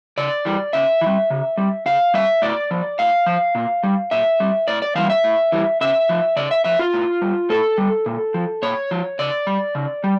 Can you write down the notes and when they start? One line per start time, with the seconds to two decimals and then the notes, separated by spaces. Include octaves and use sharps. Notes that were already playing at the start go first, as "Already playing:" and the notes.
0.18 C#3 D5
0.45 E3 G3
0.73 C#3 E5
1.01 E3
1.06 G3
1.30 C#3
1.58 G3
1.86 C#3 F5
2.14 G3 E5
2.42 A2 D5
2.71 F3
2.99 A2 F5
3.26 F3
3.55 A#2
3.84 G3
4.11 A#2 E5
4.40 G3
4.68 A2 D5
4.82 D5
4.95 E3 G3 F5
5.10 E5
5.24 A2
5.52 E3 G3
5.81 C#3 E5
6.09 F3
6.36 C#3 D5
6.51 E5
6.64 F3 E5
6.79 F4
6.93 A2
7.21 G3
7.50 A2 A4
7.78 G3
8.06 A#2
8.34 F3
8.62 A#2 C#5
8.91 F3
9.19 C#3 D5
9.47 G3
9.75 C#3
10.04 G3